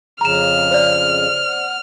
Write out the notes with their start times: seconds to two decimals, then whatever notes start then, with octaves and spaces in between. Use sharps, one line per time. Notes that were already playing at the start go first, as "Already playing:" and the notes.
0.21 F2 C#3 A#5 F6 E7
0.71 C5 D5
1.46 F#5